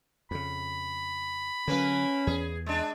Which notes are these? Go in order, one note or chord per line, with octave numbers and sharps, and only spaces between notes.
F2 C#3 B5
D3 F#3 A#3 C#4 B4
E2 G#4
G#3 D4